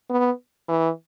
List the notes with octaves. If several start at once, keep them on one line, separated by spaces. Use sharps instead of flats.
B3
E3